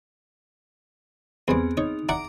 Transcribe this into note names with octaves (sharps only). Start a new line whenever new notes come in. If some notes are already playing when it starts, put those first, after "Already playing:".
E2 G3 B3 C4 G#4
D#4 C#5
E4 D5 F#5 A#5 D6 D7